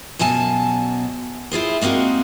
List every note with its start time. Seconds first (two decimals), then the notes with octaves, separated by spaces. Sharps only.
0.19 F#2 B2 F#3 G#5 A5
1.51 E4 F4 G#4 C5
1.81 G#3 A#3 C4 D#4 F#4